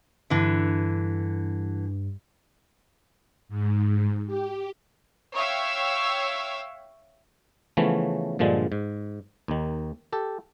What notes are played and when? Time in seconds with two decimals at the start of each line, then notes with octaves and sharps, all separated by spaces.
0.30 G2 D3 E3
3.49 G#2
4.26 G4
5.35 C#5 E5 F5 G5 E6
7.77 C#3 E3 F3 A3 B3 C#4
8.39 G2 A#2 D3 F3 G#3
8.72 G#2
9.48 D#2 D#3
10.13 G4 A4